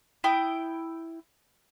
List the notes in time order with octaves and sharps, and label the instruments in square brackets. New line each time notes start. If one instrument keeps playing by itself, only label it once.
[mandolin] E4 G5 D#6